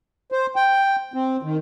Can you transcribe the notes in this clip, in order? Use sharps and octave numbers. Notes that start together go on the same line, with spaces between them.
C5
G5
C4
D#3